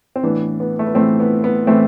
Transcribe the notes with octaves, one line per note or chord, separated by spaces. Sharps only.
C4
A2 E3 B3 D4
B3
A3
B3
A2 A3 C4
E3
B3
B3
A2 E3 A3 C4